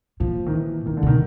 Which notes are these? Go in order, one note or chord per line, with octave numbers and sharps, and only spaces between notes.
A#2 F3
D#3
E3
A#2 D#3
D3
B2 D#3